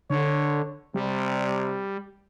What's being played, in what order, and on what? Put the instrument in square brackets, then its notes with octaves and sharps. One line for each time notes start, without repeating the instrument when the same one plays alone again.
[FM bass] D3 [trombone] C#5
[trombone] C3 [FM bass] G3